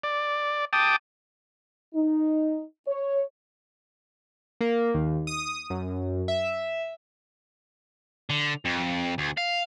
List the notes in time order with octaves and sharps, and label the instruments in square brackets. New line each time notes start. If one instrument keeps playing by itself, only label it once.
[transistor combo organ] D5
G5 A5 D6 D#6
[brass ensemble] D#4
C#5
[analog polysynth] A#3
D#2
D#6
F#2
E5
[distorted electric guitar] D3
F2
D2
F5